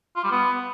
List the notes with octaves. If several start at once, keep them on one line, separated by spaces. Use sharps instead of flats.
F4
G3
B3